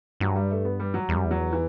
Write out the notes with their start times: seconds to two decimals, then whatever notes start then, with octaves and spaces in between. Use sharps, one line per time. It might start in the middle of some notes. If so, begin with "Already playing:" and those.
0.20 G2 F#3
0.36 G3
0.51 A3
0.65 B3
0.80 G3
0.94 F#3
1.09 E2 G3
1.16 F#2
1.25 E2
1.31 F#3
1.53 E3